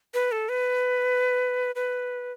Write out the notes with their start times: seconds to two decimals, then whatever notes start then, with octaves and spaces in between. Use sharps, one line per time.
0.14 B4
0.32 A4
0.49 B4
1.75 B4